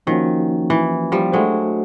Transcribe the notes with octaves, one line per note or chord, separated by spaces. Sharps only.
D#3 F3 A#3 C#4 F#4
E3
F3 G3
F#3 G#3 A3 D4 F#4 A4 C5